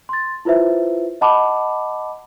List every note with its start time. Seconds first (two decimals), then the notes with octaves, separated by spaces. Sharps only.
0.09 C6 A6
0.45 E4 F4 B4 C5 E5
1.21 D#5 F#5 A5 B5 D6